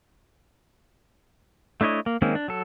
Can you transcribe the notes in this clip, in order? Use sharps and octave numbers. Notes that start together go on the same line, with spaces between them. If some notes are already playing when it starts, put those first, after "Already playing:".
A3 D4 E4 C#5 D#5
A#3
D#3 G#3 A#3 C4 C#4
D4
F#3 A4